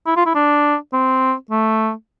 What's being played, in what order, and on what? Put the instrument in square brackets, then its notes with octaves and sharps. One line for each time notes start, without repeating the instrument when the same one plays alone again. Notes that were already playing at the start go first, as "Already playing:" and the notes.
[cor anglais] E4
F4
E4
D4
C4
A3